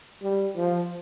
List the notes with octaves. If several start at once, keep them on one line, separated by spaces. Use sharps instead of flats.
G3
F3